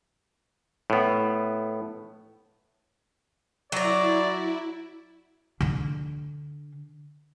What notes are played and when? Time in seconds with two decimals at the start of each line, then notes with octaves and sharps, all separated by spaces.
0.90 A2 B3
3.72 F#3 E4 D5 A#5
5.61 D3 D4